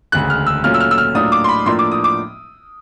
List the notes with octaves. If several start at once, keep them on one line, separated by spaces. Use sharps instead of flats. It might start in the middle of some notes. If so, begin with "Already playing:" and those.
E1 D2 C#3 F#6
F6
E6
A#2 F#3 A3 C#4 F4 F6
E6
F6
E6
F6
A2 F#3 A#3 D4 F4 D#6
D6
C6
B5
A2 F3 A#3 D4 C6
D6
D#6
D6